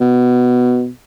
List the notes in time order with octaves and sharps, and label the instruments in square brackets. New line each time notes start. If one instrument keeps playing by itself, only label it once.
[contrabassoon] B2